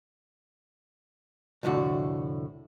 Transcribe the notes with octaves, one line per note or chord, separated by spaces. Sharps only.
C2 F2 A2 D3 F#4